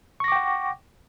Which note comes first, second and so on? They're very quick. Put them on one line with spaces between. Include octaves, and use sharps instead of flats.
C#6 A#6 D6 G5 F#5